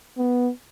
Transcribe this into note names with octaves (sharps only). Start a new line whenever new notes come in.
B3